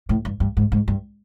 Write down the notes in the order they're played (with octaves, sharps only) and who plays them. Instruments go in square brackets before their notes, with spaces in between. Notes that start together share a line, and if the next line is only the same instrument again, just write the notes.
[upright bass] A2
G2
G2
G#2
G#2
G2